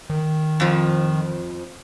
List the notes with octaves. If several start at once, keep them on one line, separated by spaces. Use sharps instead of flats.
D#3
F2 F3